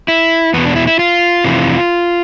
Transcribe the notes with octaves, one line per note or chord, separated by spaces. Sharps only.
E4
E2 B2 B3
D4
E4
E4
F4
F2 C3 E3